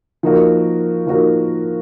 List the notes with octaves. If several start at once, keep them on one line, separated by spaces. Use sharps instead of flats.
F3 A#3 D#4 F#4 A#4
F3 A#3 D#4 F#4 A#4